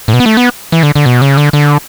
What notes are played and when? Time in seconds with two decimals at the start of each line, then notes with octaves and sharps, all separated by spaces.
0.08 A2
0.14 B2
0.20 B3
0.26 A3
0.37 B3
0.72 E3
0.83 D3
0.95 D3
1.06 B2
1.22 C#3
1.37 D3
1.53 D3